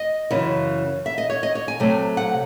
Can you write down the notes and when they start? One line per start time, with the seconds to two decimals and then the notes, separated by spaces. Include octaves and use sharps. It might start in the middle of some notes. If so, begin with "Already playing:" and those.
Already playing: D#5
0.30 F#2 C#3 E3
1.06 E5
1.18 D#5
1.30 C#5
1.43 D#5
1.55 C#5
1.68 G#5
1.80 C3 F#3 A3
2.17 F#5